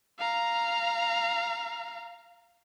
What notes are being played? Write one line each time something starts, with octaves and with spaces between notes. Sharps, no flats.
F5 A#5